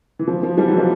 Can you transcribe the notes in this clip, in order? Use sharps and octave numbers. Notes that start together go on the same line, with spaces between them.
E3
F3
F3
F3 G3
E3 F#3
F3 G3